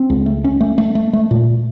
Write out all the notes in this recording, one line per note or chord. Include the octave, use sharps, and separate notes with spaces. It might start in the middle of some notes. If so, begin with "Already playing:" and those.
Already playing: C4
C#2
A3
C#4
A3
A3
A3
A3
A#2